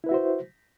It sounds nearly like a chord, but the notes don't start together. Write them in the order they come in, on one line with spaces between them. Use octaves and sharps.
E4 B4 E5 F#4 C5